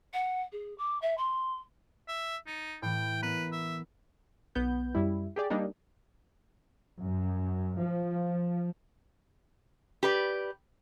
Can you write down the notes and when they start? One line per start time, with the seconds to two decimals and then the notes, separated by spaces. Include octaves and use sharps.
0.13 F#5
0.51 G#4
0.77 D6
1.01 E5
1.17 C6
2.08 E5
2.47 D#4 A6 C#7
2.82 A2 E3 G5
3.22 B3 A#4 B4
3.52 E5
4.55 B1 B3 G6
4.95 F#2 G3 E4
5.36 G4 G#4 D5
5.50 G3 A#3 D4 D#4
7.01 F#2
7.76 F3
10.03 G4 B4 D5